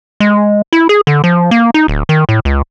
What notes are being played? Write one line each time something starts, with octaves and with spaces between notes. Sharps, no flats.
G#3
E4
G#4
D3
F3
A#3
D#4
D1
D#3
A2
C#2